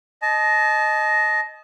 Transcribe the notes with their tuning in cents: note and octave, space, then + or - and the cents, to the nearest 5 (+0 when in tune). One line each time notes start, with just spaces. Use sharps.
D#5 +0 A5 -30